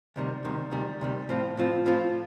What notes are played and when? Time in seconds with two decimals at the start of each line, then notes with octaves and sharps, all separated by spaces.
0.16 D2 C3 D#3 G3
0.45 D2 C3 D#3 G3
0.71 D2 C3 D#3 G3
1.01 D2 C3 D#3 G3
1.29 A2 F3 C4 F4
1.57 A2 F3 C4 F4
1.86 A2 F3 C4 F4